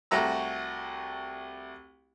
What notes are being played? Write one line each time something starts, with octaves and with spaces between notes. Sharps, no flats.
C2 A3 F#4 A#5 E6